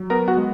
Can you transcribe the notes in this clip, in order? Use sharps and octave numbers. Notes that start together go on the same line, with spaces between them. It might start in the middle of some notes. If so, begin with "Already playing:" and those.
Already playing: F#3
B3 A#4 A#5
F#4 F#5
G#3